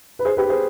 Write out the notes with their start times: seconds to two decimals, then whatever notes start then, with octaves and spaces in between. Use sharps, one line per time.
0.19 B4
0.25 G#4 C5
0.37 G4 B4
0.49 G#4 C5